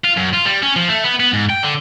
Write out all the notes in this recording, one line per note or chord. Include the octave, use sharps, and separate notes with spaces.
F4
F#2
F4
G3
C#4
F3
A3
B3
B3
G#2
G5
D3